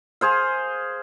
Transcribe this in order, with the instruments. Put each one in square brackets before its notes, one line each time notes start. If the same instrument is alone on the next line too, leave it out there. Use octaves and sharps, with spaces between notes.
[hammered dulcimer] G#4 C5 F5